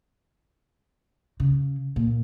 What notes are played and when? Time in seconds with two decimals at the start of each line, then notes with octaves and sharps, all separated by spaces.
1.40 C#3
1.96 A#2